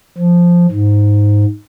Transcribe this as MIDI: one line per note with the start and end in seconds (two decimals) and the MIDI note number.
0.18 0.66 53
0.71 1.45 44